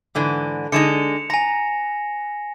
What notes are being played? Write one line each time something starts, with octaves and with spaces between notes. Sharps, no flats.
G#2 D3 E3
D3 G#3 D#4 C#7 E7 F7
G#5 A#5 A#6